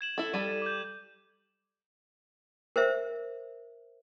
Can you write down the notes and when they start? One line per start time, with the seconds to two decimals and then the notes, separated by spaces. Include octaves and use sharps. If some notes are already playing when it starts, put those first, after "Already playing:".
0.01 G#6 E7 F#7
0.18 E4 A4
0.34 G3 A4 D#7
0.62 D6 G6
2.76 A#4 C5 E5